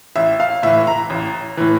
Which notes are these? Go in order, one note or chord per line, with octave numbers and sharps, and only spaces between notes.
A1 E5
F5
A2 E3 E5
A#5
A1
A2 E3